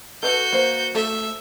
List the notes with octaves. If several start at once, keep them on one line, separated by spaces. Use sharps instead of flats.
F#4 A4 B4 A5 G6
A#3 C5
A3 A4 E5